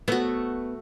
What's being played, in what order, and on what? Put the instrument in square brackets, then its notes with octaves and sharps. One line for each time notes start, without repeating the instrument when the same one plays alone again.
[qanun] A3 F#4 [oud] B3